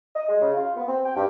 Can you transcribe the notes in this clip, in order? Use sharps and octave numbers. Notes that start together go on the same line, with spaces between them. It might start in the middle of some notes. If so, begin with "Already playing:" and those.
D#5
G#3
C#3
F4
B3
C4
G5
G2